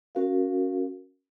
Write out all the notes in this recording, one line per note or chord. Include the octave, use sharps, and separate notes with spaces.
C#4 F#4 A#4 F5